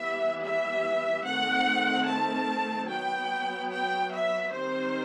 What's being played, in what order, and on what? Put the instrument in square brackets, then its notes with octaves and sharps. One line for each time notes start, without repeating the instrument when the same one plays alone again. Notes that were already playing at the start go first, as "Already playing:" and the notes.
Already playing: [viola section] E3 G3 B3 E5
E5
D#3 A3 C4 F#5
A5
F#3 B3 G5
G5
E5
D#3 G3 C4 C5